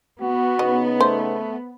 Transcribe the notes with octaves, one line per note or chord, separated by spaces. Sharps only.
B3 F#4
C#3 D#4 B4 D#5
A3 C5